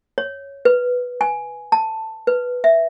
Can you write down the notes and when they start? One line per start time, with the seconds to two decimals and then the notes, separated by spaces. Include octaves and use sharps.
0.18 C#5
0.65 B4
1.21 G#5
1.72 A5
2.27 B4
2.64 E5